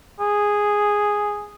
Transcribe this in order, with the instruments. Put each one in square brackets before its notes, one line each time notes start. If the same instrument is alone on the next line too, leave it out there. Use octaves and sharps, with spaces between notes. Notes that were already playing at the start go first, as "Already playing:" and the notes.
[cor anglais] G#4